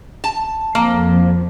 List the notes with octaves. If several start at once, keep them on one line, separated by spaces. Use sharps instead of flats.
A5
F2 A#3